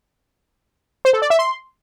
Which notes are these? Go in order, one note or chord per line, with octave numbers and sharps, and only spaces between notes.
C5
A4
D5
E5
C6